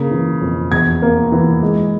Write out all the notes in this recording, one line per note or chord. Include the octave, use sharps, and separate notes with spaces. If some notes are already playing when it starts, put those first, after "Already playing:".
Already playing: C#3 A#3
E3
F2
E2 G#6
A#3
E3
G#3